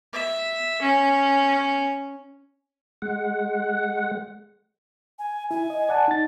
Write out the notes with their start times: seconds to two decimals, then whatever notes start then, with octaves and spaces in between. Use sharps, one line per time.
0.13 E5
0.81 C#4
3.02 G#3 F#5
5.19 G#5
5.51 E4 G#5
5.70 D#5
5.89 D5 F#5 A5
6.08 D#4 A6